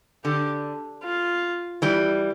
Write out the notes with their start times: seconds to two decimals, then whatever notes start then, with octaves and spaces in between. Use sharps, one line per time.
0.25 D3 G4
1.03 F4
1.82 E3 G3